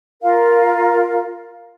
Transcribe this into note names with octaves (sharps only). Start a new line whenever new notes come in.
F4 A#4 F5